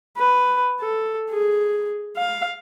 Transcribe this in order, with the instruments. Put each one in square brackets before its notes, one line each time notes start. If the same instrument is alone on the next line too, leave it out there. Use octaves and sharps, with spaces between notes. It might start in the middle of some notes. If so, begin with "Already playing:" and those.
[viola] B4
A4
G#4
F5